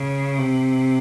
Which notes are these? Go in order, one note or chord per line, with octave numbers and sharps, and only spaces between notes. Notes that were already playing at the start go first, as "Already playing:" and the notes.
Already playing: C#3
C3